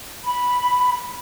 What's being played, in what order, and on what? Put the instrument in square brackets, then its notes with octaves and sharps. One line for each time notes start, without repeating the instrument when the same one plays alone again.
[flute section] B5